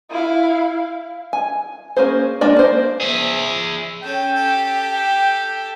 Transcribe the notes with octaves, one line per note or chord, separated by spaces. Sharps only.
E4 F5
G#5
A#3 C#4 G#4 C5
G#3 A#3 D4 D5
A#3 C5
G#4 E5
C#4 A4 G5
G4 A4